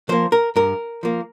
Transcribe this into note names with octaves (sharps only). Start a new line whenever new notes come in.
F3 A#3 C5
A#4
G2 A#4
F3 A#3